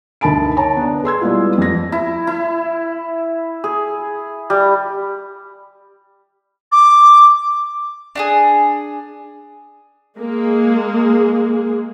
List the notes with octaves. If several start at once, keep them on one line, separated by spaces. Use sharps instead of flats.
D2 D#4 A#4 A5 B5 D7
C#5 A5 A#5
B3 D4
G#4 C6 E6 G#6
G3 G#3 B3 E4 F4
F2 A#6
E4
E4
G#4
G3
D6
D4 G4 G#4
G#3 A#3 G#4